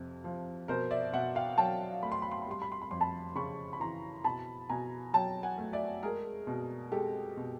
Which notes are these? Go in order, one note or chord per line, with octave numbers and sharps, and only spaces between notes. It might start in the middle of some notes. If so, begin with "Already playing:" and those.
Already playing: F2 C3
F3
B2 A#4 C5
D5 E5
B2 E5 F#5
F5 G5
F#3 G5 A5
A3 B5
C6
B5
C6
B5
G3 C6
B5
C6
B5
F2 C6
A5 B5
C#3 B5 C#6
B5
E3 A#5 C6
B2 A5 B5
B2 G#5 A#5
F#3 G5 A5
F#5 G#5
A3
D5 E5
G#3 G#4 A#4
B2
G#3 G4 A4
B2